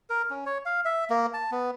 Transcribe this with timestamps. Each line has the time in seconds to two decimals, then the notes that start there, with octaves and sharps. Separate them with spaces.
0.10 A#4
0.30 C#4
0.46 C#5
0.65 F5
0.85 E5
1.10 A#3
1.34 A5
1.51 B3